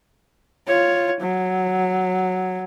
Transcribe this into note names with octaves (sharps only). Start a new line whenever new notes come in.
F4 C#5
F#3